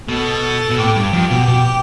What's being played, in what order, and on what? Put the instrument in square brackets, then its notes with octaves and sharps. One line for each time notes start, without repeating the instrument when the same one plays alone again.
[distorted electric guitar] B2 [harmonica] A4
[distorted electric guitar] B2
[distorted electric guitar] A2 [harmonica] G4
[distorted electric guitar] G2
F2
B2
B2